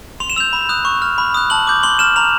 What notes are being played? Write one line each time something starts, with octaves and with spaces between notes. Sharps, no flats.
C6 F7
E7
E6 G6 F7
B5
D#6 F#6
C#6
F6
B5
D#6 F#6
A5 F#7
D6 G6
C6 F#7
F6 E7
A#5 F7